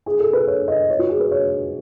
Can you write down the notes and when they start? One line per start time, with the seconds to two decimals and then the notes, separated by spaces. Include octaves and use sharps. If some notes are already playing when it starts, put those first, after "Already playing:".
0.06 G#4
0.19 A4
0.33 B4
0.47 C#5
0.68 D#5
0.90 C#5
0.99 F#4
1.10 G#4
1.20 B4
1.31 C#5